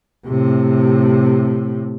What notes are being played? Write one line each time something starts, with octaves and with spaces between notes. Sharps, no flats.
A2 C3